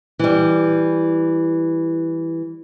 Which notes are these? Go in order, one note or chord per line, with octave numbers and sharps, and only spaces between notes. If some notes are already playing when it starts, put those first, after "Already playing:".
E3 G3